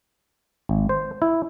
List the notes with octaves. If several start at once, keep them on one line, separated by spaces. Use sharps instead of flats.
G#1
C5
E4